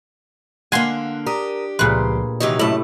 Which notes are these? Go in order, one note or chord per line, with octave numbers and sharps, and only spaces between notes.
D3 A#3 F5 F#5 G#5 C6
D4 G4 A#4 A#5 D#6
C#2 A#2 F3 A3 G#4 B4 C6
C3 D#3 E3 F#3 D#4 D#5
F#2 A2 C3 A3 A5 B5